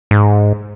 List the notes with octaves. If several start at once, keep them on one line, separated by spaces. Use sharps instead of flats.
G#2